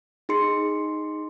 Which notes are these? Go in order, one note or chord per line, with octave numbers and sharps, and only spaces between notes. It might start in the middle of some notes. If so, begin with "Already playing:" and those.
D#4 G#4 C6 C#7